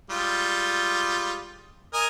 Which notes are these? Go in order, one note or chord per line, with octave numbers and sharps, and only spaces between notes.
G3 G#3 F4
A#4 D#5 G#5